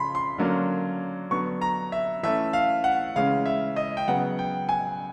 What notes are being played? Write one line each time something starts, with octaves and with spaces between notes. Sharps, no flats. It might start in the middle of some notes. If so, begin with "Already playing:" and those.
Already playing: C#3 F3 A3 B5 C6
C6
D3 F#3 A#3 C#4
D3 F#3 B3 C#6
A#5
E5
E3 A3 C#4 E5
F5
F#5
C#3 E3 G#3 C#4 F5
E5
D#5
G5
C#3 F#3 B3 F#5
G5
G#5